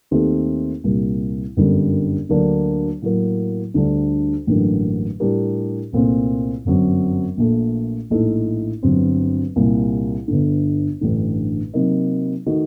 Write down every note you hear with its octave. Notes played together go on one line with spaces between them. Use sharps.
D#2 D#3 A3 C4 G4
C2 A#2 G3 A#3
G1 F#2 D3 G3 A#3
D2 D3 F#3 A#3 D4
A2 F#3 A#3
D2 D3 G3 D4
A1 G2 D3 F#3 A#3
A2 G3 D4 G4 A#4
C2 A#2 A3 C4
G1 F#2 F#3 C4
A#1 A#2 A3
A#1 A2 A3 D#4 A4
G1 G2 F#3 C4
C2 A#2 G3
G1 G2 D3
A1 G2 D3
C3 F#3 A#3 D#4
D#3 A3 D#4 F#4